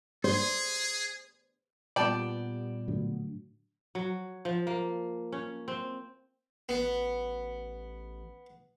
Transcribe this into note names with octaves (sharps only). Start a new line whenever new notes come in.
G#4 C5
A#2 G3 B3 D5 G5 A5
A2 D3 F#3
F#3
F3
A#3
C#4
C4
A1 B3